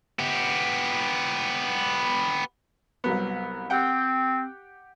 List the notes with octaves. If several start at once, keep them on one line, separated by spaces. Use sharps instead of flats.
B3 G4
C2 F#3 B3
C4 G4 F#5 G5